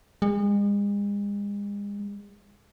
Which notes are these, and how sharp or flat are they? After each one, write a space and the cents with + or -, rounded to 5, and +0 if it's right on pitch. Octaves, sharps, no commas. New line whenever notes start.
G#3 -40